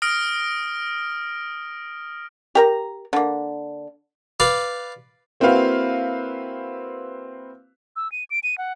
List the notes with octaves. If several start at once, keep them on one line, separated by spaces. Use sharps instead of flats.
D#6 F6 A#6 D7
G4 A#4 A#5
D3 A#3
B4 D5 F5
A#3 C4 E4 F#4 B4 F5
E6
D#7
D7
D#7
F#5